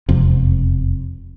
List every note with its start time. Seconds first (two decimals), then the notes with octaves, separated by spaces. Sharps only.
0.09 E1 F2 C3